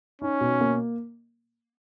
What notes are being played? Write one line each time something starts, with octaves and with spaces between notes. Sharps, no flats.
C#4 D#4
B2
A#3